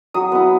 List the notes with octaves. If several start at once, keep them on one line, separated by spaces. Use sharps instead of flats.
F#3 D#6
B3 E4